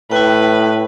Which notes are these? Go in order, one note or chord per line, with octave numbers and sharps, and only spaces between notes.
A2 E4 B4 G5